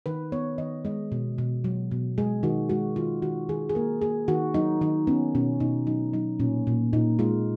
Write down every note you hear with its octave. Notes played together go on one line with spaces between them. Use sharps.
D#3 B4
B3 C#5
D#3 D#5
G#3 D#5
B2
B2
F#3
B2
G#3 G#4
D#3 F#4
G#3 F#4
D#3 F4
D#3 F#4
D#3 G#4
G#4
A#3 A#4
A#3 G#4
D#3 F#4
F#3 D#4
D#3 D#4
B3 C#4
B2 C#4
B2 D#4
F#3 D#4
F#3 D#4
A#2 C#4
A#2
A#2 D#4
G#3 F4